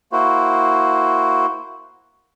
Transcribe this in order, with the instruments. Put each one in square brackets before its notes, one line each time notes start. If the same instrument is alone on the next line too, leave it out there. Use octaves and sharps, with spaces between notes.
[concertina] A#3 E4 F#4 C5